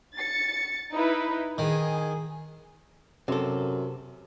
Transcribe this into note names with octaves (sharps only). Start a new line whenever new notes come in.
A6 C#7
D#4 E4 B4
D#3 G#4
F#2 C3 A4